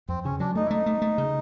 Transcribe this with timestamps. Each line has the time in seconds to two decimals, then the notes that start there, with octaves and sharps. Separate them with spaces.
0.09 F2 C4
0.25 C#3 C#4
0.40 F#3 D4
0.55 A3 D#4
0.66 E4
0.71 A3 D#4
0.86 A3
1.02 A3
1.18 C#3